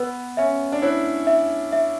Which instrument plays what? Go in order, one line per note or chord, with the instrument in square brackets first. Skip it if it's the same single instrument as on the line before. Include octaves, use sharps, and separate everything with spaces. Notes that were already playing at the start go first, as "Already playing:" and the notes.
Already playing: [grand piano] B3 [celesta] B4
[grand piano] C#4 [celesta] E5
[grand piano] D4
[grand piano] E4 [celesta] C#5
[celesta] E5
E5